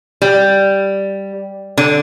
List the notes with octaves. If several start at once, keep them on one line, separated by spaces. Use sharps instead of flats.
G3
D3